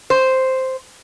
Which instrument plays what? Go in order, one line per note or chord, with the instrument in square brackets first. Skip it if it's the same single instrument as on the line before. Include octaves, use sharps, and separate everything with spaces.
[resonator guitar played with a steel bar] C5